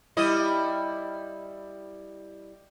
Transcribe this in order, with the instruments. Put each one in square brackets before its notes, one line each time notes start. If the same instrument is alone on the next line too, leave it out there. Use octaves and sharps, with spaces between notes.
[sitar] G3 E4 D#5